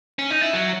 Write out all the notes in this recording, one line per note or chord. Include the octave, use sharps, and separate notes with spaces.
C#4
D#4
E4
F#3